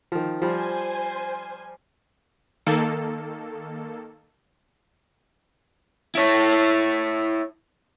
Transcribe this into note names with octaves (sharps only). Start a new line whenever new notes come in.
D#3 F3
F3 G3 C5 G#5
D#3 A#3 A4
E4 C#5